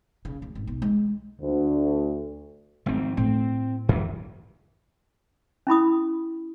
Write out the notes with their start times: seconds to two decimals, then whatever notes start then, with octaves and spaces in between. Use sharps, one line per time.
0.25 C#3
0.42 D2
0.55 G#1
0.67 B1
0.82 G#3
1.41 D2
2.86 G#1 F3 C4
3.17 A2 C4
3.89 F#2 E3
5.67 C#4 E4 B5 D#6